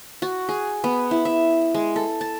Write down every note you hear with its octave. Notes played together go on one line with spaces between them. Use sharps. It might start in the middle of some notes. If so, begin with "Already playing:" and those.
F#4
G#4
B3
E4
E5
G#3
A4
A5